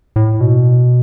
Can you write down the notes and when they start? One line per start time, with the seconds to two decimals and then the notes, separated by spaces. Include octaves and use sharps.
0.16 A2
0.41 B2